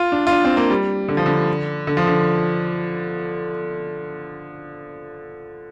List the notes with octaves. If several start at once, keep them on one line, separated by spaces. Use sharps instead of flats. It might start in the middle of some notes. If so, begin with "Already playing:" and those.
Already playing: F4
D4
F4
D4
C4
A#3
G3
D3
F3
D3
D3
F3
D3